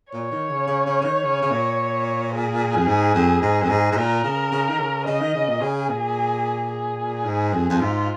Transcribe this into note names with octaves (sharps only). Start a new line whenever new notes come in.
A#2 C#5
D#3
C#3
C#3
C#3
C#3
D#3
C#3
C#3
A#2
G#4
F2
G#2
F2
G#2
F2
G#2
G#2
A#2 A#4
C#3
C#3
D#3
C#3
C#3 D#5
D#3
C#3
A#2
C#3 G#4
A#2
G#4
G#2
F2
F2
G#2 F4